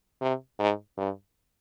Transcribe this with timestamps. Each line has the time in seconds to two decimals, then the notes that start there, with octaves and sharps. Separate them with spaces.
0.21 C3
0.59 G#2
0.97 G2